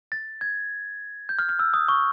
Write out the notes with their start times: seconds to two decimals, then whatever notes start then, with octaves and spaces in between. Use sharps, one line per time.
0.12 A6
0.41 G#6
1.29 G6
1.39 F6
1.49 F6
1.59 E6
1.74 D#6
1.88 C#6